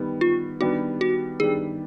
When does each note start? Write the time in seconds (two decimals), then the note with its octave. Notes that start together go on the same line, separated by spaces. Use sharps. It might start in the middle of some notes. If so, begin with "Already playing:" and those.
Already playing: D#3 G3 B3
0.21 F4
0.60 D#3 G3 B3 D4 F#4 G4
1.01 F#4
1.39 D#3 G3 B3 D4 G4 G#4